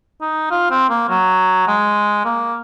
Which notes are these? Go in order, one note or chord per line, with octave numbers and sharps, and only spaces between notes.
D#4
F4
C4
A#3
F#3
G#3
A#3